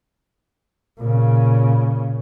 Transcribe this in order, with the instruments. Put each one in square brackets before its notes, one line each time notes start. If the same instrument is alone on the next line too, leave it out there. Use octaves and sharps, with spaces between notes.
[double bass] A#2 C#3